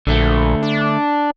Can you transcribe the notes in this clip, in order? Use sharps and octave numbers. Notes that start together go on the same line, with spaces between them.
A#1 D3 A3
D4